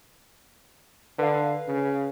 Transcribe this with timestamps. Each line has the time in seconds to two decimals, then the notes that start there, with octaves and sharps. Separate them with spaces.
1.18 D3 B4 F5
1.68 C#3